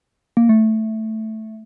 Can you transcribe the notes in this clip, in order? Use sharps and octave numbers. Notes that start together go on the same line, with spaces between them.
A#3
A3